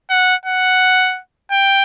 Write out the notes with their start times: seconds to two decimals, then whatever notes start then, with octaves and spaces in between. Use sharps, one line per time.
0.10 F#5
0.46 F#5
1.52 G5